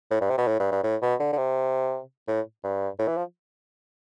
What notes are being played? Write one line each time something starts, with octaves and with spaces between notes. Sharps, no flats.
A2
G2
C3
B2
A2
G2
G2
A2
B2
D3
D3
C3
A2
G2
A2
E3
F3